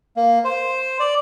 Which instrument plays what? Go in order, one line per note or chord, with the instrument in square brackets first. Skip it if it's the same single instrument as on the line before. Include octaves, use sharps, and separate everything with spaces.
[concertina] A#3
C5
D5